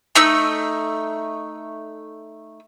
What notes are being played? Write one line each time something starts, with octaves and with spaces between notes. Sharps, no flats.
A3 D#4 E6